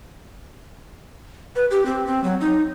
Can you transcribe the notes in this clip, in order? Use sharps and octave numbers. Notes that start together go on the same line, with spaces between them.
B4
G4
C4
C4
F#3
D#4